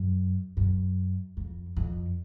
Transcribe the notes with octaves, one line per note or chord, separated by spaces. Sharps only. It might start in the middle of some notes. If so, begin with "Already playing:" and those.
Already playing: F#2
F#2
F2
F2